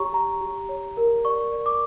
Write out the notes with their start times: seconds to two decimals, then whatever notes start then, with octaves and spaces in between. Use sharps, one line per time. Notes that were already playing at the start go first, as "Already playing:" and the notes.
Already playing: G4 C#5 A#5 C#6
0.13 G4 A#5
0.41 G4
0.69 C#5
0.97 A#4
1.25 D5 C#6
1.52 D5
1.66 D6